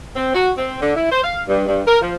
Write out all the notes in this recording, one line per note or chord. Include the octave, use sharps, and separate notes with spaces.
C4
F#4
C4
D3
E4
C5
F5
G2
G2
A#4
F3